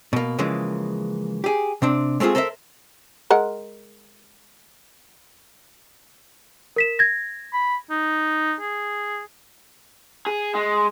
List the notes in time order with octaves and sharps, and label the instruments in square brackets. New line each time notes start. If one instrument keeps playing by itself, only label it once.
[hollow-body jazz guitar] B2 A#3
C#3 E3 F3 G#3 A#3
G4 G#4
C3 C4 D4
G#3 A3 C4 F4 G#4
A4 A#4 C5 D#5 E5
[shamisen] G#3 A#4 F#5
[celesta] A#4 B6 E7
G#6 A#6
[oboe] B5
D#4
G#4
[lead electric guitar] G#4
G#3